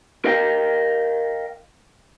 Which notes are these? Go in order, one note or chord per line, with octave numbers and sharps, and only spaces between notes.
A#4 D#5 F5 G5